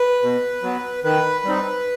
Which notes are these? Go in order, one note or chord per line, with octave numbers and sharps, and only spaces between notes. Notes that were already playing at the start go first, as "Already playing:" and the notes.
Already playing: B4
B2
F#3 B3
D#3 B4
G3 C4 D#4